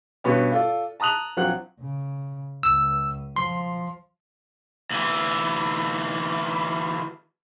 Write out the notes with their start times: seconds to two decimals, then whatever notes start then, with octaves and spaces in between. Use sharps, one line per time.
0.24 G2 B2 B3 C#4
0.52 F4 A4 D5
1.00 A5 A#5 D#6 F#6 F7
1.37 A#1 F3 F#3 C4 F#5 F#6
1.79 C#3
2.63 C#2 E6
3.36 F3 C6
4.91 D2 E3